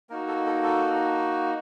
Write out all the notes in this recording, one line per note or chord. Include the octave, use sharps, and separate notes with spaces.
A#3 D#4 F#4 A#4
A4
A4
A4